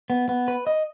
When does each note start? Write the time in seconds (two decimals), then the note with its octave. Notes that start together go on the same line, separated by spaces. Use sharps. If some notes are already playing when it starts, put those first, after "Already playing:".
0.10 B3
0.29 B3
0.48 B4
0.67 D#5